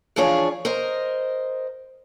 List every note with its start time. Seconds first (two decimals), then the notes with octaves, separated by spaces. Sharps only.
0.16 E3 F3 D4 F4 G#4 C#5
0.65 A#4 C5 D#5